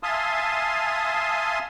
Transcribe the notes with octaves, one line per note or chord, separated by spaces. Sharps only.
E5 F5 G#5 A5 C6 D#6